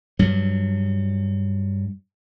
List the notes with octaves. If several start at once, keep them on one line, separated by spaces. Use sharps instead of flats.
G2 F#3